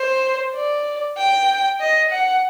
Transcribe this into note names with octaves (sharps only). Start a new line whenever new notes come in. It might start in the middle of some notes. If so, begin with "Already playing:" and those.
Already playing: C5
D5
G5
D#5
F#5